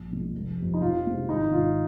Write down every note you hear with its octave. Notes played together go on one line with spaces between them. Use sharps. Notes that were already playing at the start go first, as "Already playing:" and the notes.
Already playing: A#1
A#2 G#3
F1
F2 C3
D#4
F2 F4
C3 F3 G#3
G#1 D#4
G#2 D#3 F4